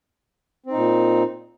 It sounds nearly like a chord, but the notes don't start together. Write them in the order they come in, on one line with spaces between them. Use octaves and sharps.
C4 D#4 A#2